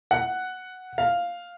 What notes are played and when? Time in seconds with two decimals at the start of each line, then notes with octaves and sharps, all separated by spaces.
0.11 F#5
0.98 F5